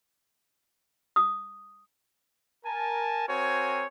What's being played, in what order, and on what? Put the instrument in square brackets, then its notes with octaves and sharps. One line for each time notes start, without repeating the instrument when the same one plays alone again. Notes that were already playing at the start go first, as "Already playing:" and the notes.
[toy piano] D#6
[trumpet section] A#4 G#5 A5
C4 F#4 A#4 C5 C#5 G#5